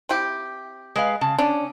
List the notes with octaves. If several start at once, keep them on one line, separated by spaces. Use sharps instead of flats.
C4 E4 G4
G#3 B4 F5
C#3 A5
C#4 D4